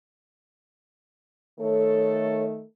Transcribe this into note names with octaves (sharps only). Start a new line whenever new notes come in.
D#3 A3 A4 C#5